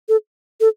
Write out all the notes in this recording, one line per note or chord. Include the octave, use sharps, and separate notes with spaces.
A4
A4